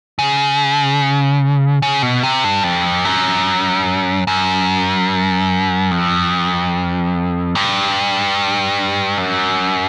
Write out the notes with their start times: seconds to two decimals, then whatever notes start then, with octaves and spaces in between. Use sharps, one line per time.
0.19 C#3
1.82 C#3
2.02 B2
2.23 C3
2.44 G2
2.64 F2
3.05 F#2
4.27 F#2
5.91 F2
7.55 G2
9.18 F#2